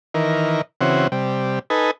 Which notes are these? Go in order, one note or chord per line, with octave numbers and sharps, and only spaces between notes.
D#3 E3 A#4
C#3 E3 C4 F#4
C3 G3
D#4 A4 B4 G#5